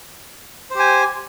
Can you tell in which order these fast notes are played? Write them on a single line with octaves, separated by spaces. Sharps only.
C5 G4 G#5